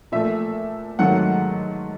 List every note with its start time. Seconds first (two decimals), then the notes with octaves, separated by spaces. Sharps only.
0.12 A#2 F3 A3 E5
0.99 G#2 D#3 F#3 A3 F#5